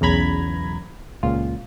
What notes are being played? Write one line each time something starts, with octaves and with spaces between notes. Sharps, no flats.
B1 E2 C#3 A#5 B5 G#6
C#2 A#2 F4